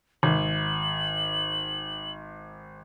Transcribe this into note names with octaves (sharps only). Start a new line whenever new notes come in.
G#1 F#7